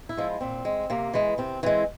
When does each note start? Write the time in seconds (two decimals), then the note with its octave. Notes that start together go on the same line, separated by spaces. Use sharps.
0.09 E4
0.17 F3 G#3
0.41 A#2 C4
0.65 G#3
0.90 C3 A#3
1.14 E3 G#3
1.38 C3 C4
1.63 E3 G#3 C4